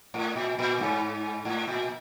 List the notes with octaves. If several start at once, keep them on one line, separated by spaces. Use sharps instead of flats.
A2
A#2
A#2
G#2
A2
A#2